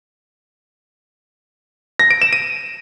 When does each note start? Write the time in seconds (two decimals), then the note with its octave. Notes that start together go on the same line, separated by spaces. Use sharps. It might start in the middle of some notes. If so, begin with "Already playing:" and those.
1.99 A#6
2.11 D7
2.22 E7
2.33 D#7